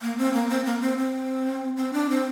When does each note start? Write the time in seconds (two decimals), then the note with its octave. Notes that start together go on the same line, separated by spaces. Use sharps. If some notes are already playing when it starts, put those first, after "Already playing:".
0.02 A#3
0.18 C4
0.34 A#3
0.49 C4
0.65 A#3
0.81 C4
0.98 C4
1.77 C4
1.93 D4
2.09 C4